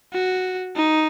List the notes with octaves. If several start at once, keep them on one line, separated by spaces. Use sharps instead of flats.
F#4
D#4